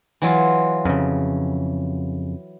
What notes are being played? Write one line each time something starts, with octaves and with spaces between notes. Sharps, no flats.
E3 F#3 F4
F2 C#3